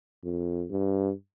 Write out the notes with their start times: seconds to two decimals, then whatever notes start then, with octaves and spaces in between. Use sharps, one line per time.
0.24 F2
0.70 G2